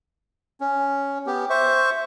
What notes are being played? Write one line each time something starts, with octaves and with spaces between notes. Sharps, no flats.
C#4
B3 G4
C5 E5 C#6